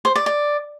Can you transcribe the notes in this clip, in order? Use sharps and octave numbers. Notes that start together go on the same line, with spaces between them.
C5
D5
D5